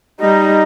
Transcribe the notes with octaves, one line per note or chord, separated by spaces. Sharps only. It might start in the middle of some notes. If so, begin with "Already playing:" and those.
G3 D#4